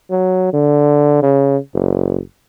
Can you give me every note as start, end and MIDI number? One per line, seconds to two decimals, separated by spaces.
0.11 0.52 54
0.53 1.18 50
1.22 1.57 49
1.74 2.19 30